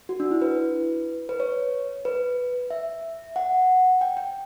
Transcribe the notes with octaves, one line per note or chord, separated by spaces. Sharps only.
F#4
D4
E4
B4
B4
C#5
B4
E5
F#5
G5
G5